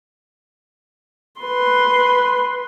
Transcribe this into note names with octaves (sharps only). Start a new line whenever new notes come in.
B4 C6